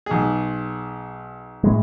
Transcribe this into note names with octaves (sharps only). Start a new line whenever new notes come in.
B1 G#4
A2 G#3